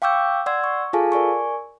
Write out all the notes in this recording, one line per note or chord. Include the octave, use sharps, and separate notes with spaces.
F5 G5 C#6 D6 E6 G6
D5 F#5 C6 E6 G#6
C#6
F4 G#4 A4 F5 G#5 A5
A#4 D5 G#5 C#6